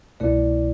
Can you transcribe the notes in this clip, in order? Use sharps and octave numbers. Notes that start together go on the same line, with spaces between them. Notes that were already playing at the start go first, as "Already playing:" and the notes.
C2 B2 A3 E4 D5